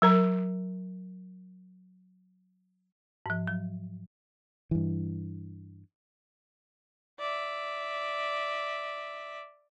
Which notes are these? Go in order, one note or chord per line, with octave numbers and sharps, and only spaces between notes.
F#3 A#4 A#5
G#2 F3
F#3
G2 E3
D5 E5